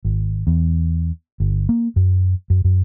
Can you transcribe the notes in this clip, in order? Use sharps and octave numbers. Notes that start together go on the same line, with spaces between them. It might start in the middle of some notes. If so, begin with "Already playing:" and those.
G#1
E2
G1
A#3
F#2
F#2
F#2